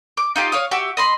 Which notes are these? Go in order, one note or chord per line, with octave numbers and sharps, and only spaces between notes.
D6
D#4 F4 G4
C#5 F5 D#6
F#4 G4 E5
D#5 B5 C6